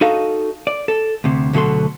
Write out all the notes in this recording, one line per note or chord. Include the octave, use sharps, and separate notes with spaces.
D#4 F#4 A4 D#5 F5
D5
A4
D2 C3
D2 B2 F#3 A4 C6